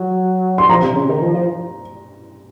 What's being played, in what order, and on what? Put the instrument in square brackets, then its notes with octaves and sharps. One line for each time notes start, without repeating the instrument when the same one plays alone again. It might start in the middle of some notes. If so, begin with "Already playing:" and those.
Already playing: [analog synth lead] F#3
[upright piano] C6
[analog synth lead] F3 [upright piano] A#5
[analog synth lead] C3
C#3
D#3
F3
F3